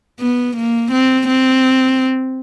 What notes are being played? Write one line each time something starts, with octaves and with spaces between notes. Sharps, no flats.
B3
A#3
C4
C4